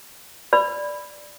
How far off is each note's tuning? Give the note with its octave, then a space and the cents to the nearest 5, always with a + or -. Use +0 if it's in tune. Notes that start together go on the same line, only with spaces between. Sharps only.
D5 +0 B5 +0 E6 +40